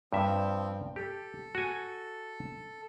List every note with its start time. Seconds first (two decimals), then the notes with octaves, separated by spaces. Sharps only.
0.13 G2 F3 C4 E5
0.96 G4 A4
1.55 F#4 G#5